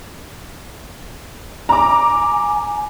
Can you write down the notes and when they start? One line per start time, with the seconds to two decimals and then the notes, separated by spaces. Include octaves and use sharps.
1.69 G#5 A#5 D6